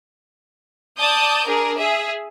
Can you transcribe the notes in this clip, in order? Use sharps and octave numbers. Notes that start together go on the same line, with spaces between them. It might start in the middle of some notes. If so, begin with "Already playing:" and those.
D5 A5 D#6 G6
D4 G#4 A#4
G#4 E5